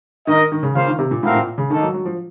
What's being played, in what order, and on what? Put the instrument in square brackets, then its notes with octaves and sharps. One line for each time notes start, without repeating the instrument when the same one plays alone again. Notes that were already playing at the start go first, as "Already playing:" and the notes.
[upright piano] D#3 [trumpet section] D#4 A#4 D#5
[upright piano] D#3
C#3
[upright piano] C#3 [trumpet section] A#3 F4 C5 F5
[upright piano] D#3
C3
A#2
[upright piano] A2 [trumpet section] A3 C4 F#4 A#4 F5
[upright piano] A#2
C#3
[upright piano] D#3 [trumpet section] A#3 D#4 A4
[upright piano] F#3
F#3
F3